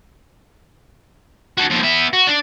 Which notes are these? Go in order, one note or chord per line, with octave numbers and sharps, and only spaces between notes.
F#4 A4
D#2 F3
B3 E5
F#4
D4